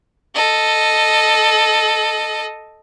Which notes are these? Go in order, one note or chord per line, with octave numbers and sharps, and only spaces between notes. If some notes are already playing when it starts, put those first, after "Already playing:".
A4 D#5